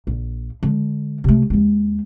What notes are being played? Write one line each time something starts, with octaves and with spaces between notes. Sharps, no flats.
A#1
D3 G#3
C3 A3
D#2 G#3